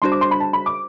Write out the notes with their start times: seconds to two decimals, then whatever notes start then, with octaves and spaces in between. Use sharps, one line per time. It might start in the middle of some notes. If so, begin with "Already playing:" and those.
0.02 G3 D4 F#4 C5 C6
0.12 D6
0.21 C6
0.31 B5
0.40 A5
0.53 B5
0.66 D6